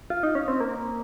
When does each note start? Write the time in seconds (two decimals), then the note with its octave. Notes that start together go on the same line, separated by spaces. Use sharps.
0.10 F4
0.23 D#4
0.35 C#4
0.48 C4
0.60 A#3